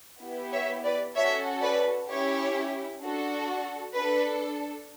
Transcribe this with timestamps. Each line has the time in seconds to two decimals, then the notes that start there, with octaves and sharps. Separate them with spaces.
0.22 B3 E4 G4
0.53 C#5 E5
0.84 B4 D5
1.15 C#4 F#4 A4 C#5 E5
1.62 B4 D5
2.09 C#4 E4 G4 C#5
3.03 D4 F#4 A4
3.96 D4 A4 B4